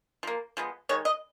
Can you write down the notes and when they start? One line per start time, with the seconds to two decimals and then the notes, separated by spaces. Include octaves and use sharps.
0.23 F3 A#3
0.57 F3 G#3 B3
0.89 D#3 G#3 C#5
1.05 D#5